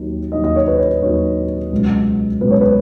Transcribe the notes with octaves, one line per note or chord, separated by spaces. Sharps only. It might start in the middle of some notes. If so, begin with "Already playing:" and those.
Already playing: D#2 D#3 F#3
D#2 D#3 F#3 D#5
D#5
C#5
B4
C#5
D#2 D#3 F#3 C#5
C#2 B2 F#3 B3
C#2 B2 F#3 B3 B4
C#5
B4